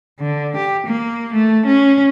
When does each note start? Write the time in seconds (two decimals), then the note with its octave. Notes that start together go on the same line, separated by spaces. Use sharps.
0.20 D3
0.57 G4
0.87 A#3
1.34 A3
1.67 C#4